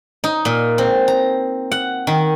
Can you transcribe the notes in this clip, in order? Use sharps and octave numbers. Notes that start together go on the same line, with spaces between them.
D#4
A#2
C4
A#5
F#5
D#3